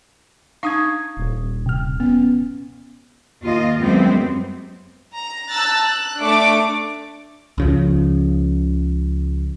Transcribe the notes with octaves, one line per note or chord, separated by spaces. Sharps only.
D4 D#4 F5 C#6 D#6 G#6
D#1
C3 F6
B3 C#4
D#2 F4 D#5
F#2 G3 G#3 B3 C4
A#5
A5 A#5 E6 F#6 A6
F#6
A3 D4 D6
C#2 C#3 F3